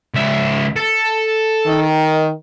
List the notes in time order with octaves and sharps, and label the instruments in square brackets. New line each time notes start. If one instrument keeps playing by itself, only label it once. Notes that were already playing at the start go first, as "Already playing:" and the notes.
[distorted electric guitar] C#2 E5
A4
[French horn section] D#3